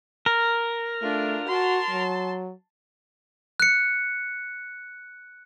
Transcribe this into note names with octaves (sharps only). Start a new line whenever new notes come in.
A#4
A3 D4 F4
F#4 A5 C6
F#3
F#6 C#7